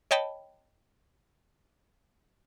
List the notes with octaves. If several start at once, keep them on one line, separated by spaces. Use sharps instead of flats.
C#5 D#5 G5 A5 B5